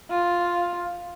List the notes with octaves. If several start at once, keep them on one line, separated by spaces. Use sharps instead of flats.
F4